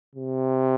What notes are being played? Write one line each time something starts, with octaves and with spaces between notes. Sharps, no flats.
C3